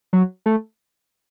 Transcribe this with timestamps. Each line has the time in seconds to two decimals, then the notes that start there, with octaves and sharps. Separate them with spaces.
0.13 F#3
0.46 A3